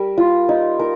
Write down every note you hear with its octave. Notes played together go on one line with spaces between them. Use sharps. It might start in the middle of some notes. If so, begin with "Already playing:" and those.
Already playing: G3 A#4
F4
D#4
A#4